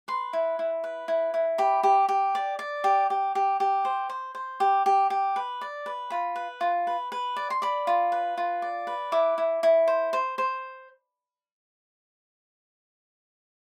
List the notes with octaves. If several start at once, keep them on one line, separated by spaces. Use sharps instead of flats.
B4 C6
E4
E4
B4
E4
E4
G4 B5
G4
G4
D5
D5
G4
G4
G4
G4
C5
C5
C5
G4
G4
G4
B4
D5
B4
F4 B5
B4
F4
B4
B4
D5
C6
D5 B5
F4
B4
F4
D5
B4
E4 D6
E4
E4
C5
C5
C5